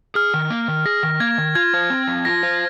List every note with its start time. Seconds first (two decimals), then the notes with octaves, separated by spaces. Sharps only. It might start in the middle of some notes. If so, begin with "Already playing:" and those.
0.15 G#4 F6
0.34 D#3
0.50 A#3
0.68 D#3
0.86 G#4 A#6
1.03 D#3
1.20 A#3 G#6
1.38 D#3
1.55 F4 G#6
1.74 C5
1.90 C4
2.08 F3
2.25 F4 A#6
2.43 C5